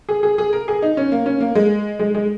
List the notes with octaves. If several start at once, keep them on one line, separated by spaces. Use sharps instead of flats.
G#4
G#4
G#4
A#4
G#4
D#4
C#4
A#3
C#4
A#3
G#3
G#3
G#3